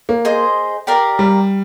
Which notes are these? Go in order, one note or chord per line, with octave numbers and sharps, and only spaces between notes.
A#3
G#4 C5 D#5
G4 A#4 D5 F5
G3